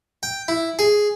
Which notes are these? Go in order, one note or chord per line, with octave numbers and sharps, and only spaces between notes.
G5
E4
G#4